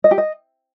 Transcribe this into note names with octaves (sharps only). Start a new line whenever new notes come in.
D#5
G4
D#5